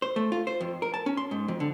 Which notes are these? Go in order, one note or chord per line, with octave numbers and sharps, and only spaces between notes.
C5
A3
F4
C5
F2
A#4
A5
C#4
C6
G#2
F2
D3